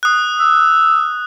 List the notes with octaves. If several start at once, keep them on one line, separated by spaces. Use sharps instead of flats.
D#6 F#6
E6